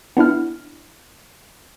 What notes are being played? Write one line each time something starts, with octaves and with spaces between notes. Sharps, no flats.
B3 D4 E4 F6